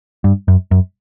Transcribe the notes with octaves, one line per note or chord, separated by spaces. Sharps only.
G2
F#2
F#2